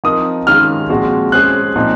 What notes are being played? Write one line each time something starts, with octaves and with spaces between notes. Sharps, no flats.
F3 C4 D#4 A#4 D#6
D#3 G#3 C#4 F4 G#4 F6
A#2 F3 G#3 C4 F#4
G#3 C#4 G#4 C5 F#6
A#2 F3 C4 D#4